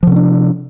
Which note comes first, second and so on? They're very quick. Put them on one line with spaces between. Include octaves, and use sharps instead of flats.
F3 C3 C#4 D4